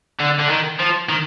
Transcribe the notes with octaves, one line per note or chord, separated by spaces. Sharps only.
D3
D3
D#3
F3
D#3